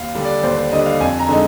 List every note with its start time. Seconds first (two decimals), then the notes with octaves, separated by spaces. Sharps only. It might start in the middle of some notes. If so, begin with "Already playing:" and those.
Already playing: D#2 F5
0.15 D3 G3 D4
0.24 D5
0.43 D#2 C5
0.57 C5
0.71 D3 G3 D4 D#5
0.86 F5
1.00 F2 G#5
1.19 A#5
1.28 D3 G#3 D#4